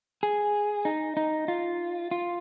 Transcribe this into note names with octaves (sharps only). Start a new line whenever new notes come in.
G#4
D#4
D#4
F4
F4